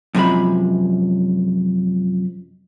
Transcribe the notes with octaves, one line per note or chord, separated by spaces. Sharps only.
F#2 C3 F3 G#3 B5